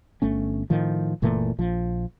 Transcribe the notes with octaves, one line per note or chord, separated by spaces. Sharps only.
G1 A3 C#4
A2 D#3 F3
F#1 A#2 E3 A3
A#1 F3